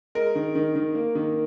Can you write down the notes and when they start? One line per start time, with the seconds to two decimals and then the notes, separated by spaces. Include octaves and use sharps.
0.15 G#3 A#4
0.35 D#3
0.55 D#3
0.76 D#3
0.95 A#3
1.15 D#3